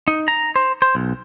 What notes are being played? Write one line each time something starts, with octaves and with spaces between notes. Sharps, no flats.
D#4
A#5
C5
C5
B1